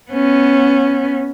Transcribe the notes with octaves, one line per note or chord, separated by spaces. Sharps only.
B3 C#4